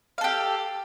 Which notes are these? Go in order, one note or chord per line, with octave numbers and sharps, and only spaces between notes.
G4 A4 F5